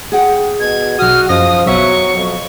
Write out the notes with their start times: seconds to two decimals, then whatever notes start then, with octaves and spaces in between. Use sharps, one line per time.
0.12 G#4 F#5 G5
0.60 B2 G#6
0.99 B1 F#4 D#6 F6
1.29 F#2 F3 D#5 D#6 A#6
1.66 B1 B2 F#3 E5 C#6
2.17 F2